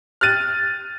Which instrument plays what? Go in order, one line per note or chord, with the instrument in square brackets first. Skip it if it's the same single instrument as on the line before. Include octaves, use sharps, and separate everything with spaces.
[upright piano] F6 F#6 A6 D#7